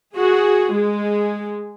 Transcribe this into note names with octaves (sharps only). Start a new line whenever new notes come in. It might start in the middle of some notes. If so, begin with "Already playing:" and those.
F#4 G#4
G#3